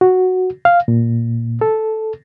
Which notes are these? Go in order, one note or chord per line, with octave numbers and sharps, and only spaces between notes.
F#4
F5
A#2
A4